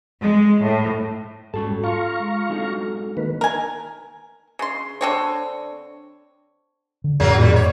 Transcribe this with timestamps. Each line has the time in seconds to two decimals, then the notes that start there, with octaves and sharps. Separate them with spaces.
0.21 G#3
0.62 A2
1.54 G#2 G3 C#4 F#4 A4 A5
1.84 F4 F5 A#5 C#6
2.20 G#3 C6
2.50 G#3 C4 D4 D#4 F#4 A4
3.17 D#3 A#3 B4
3.41 A#4 G#5
4.59 C#3 C6
5.01 D3 C4 C#5
7.04 D3
7.20 F2 A2 F#3 A#3 C#4 F#4 G#4
7.38 A#2 D#3 G3
7.56 C#5 D5